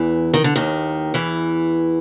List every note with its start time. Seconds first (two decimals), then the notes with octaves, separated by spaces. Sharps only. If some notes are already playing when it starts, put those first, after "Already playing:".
Already playing: E2 E3
0.34 D#3
0.44 D3
0.56 D#2 D#3
1.14 E2 E3